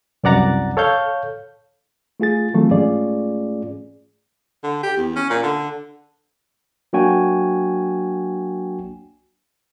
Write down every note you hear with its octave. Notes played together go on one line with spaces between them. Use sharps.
C2 F#2 D5 F#5 A#5 A6
A4 C#5 F5 G6
A3 F4 G#4 A6
D#3 E3 F#3 A3 C4 F4
G#2 A3 C#4 F4 G#4 D5
D3
G4
E2
C#4
A#2
D3
F#3 A#3 D4 F#4 G5 G#5